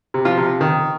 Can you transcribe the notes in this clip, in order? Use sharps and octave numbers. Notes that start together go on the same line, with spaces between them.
C3
F3 F4
C3
D#3